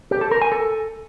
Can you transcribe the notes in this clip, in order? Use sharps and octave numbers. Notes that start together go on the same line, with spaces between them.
G4
A4
A#4
G#5
A4